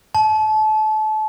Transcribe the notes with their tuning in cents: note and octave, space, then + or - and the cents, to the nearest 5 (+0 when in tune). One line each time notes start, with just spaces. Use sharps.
A5 -30